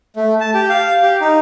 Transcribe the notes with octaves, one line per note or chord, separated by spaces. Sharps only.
A3
A5
G4
F5
G4
D#4